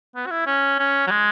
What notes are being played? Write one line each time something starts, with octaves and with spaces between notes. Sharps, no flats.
B3
F#4
E4
C#4
C#4
F#3
G#3